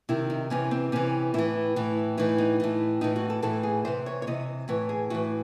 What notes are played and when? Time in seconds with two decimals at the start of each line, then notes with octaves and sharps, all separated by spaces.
0.09 C3 D#3 E4
0.30 D#4
0.50 C3 E3 C#4
0.71 C4
0.92 C3 E3 C#4
1.34 A2 E3 E4
1.76 A2 E3
2.18 A2 E3 D#4
2.38 D#4
2.60 A2 E3
3.01 A2 E3 D#4
3.16 F#4
3.30 A4
3.43 A2 E3 A4
3.63 G#4
3.85 C3 E3 C5
4.06 C#5
4.22 C#5
4.27 C3 E3 D#5
4.68 A2 E3 C#5
4.89 G#4
5.10 A2 E3 F#4